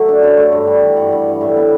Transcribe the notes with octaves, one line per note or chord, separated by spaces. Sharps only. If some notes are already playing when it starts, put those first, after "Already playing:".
Already playing: F#3 A3 F#5
D4
F#2
A3
G2
G3
E3
G2 F#5
G2
G3
A2 E5
B3